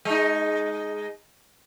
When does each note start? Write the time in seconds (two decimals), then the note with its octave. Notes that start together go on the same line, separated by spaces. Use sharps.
0.05 G#3 D#4